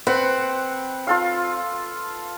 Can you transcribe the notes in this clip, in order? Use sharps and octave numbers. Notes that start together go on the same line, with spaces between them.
C4 B4 F#5
F4 A4 F5